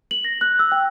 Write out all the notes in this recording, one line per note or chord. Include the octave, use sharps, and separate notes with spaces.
F#7
A#6
F#6
E6
G5